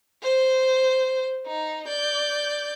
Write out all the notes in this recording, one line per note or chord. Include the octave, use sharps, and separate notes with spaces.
C5
D#4
D5 G6